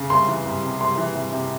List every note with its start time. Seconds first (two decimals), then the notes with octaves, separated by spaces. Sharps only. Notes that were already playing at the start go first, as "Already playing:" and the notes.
Already playing: C#3
0.10 C2 C6
0.28 E3
0.46 C2
0.63 C3
0.80 C2 C6
0.98 E3
1.15 C2
1.32 C3